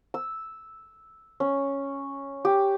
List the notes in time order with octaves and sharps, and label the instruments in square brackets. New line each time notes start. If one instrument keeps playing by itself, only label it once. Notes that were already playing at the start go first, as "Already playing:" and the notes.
[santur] E6
C#4
G4